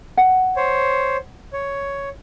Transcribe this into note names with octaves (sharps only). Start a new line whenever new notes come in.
F#5
C5 C#5
C#5